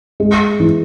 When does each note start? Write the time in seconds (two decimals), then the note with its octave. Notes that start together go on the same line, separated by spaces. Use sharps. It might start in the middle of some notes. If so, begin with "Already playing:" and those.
0.20 G#3
0.60 E3